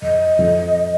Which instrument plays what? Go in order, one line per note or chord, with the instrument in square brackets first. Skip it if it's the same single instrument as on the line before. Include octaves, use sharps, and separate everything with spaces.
[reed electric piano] F2 [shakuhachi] D#5
[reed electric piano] F2